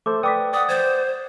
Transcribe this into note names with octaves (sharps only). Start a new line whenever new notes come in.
A3 A4 C5 D6
B4 D5 G5 D6 D#6 B6
D5 F#5 D#6
C5 G#6 A6